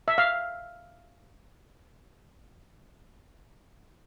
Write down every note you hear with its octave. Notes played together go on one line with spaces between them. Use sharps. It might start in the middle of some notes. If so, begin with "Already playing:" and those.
E5
F5